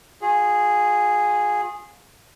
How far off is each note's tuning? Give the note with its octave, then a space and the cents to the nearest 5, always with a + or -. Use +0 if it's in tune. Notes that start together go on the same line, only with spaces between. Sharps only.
F4 +40 G#4 -5